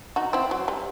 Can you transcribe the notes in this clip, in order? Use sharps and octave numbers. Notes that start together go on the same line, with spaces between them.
D#4 F#4
C4 E4
F#3
G3